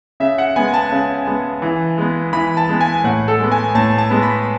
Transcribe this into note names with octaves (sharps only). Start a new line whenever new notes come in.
C#3 E5
F#5
G#3 B3 G#5
A5
C#3
G#3 B3
E3
G#3 B3
E3 B5
A5
G#3 B3
G#5
A2 F#5
A4
G#3 B3
G#5
A2 A5
A5
G#3 B3
B5